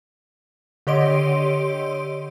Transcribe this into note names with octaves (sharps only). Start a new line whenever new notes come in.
D3 G4 C#5 D#5 C6 D7